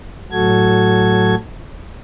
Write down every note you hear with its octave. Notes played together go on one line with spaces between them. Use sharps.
A2 F#3 F#4 A4 G#6